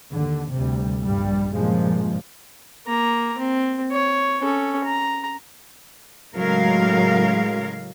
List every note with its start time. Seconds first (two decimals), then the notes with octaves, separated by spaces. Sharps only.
0.11 D#2 D3
0.53 D2 C3 G3
1.02 A#1 G2 G3
1.53 G2 A#2 C#3 F3 G#3
2.87 A#3 A#5
3.39 C4
3.91 C#5
4.41 C#4 A4
4.84 A#5
6.35 A2 C#3 F#3 G#3 A#4 F5